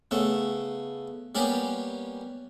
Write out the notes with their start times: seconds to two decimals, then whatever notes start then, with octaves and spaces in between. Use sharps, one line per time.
0.11 C#3 A3 B3
1.35 G3 A#3 B3 C#4 G4